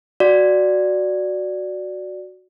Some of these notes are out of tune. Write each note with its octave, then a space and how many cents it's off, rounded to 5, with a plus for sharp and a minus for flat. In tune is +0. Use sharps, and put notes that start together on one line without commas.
F#4 +0 D5 +0